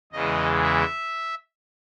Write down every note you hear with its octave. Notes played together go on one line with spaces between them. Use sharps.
E2 C#3 E3 G#3 D#5
E5